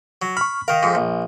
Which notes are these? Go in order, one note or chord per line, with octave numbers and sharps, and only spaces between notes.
F#3
B5 C#6 F6
D#3 A#4 F5
F2 G#2
A#1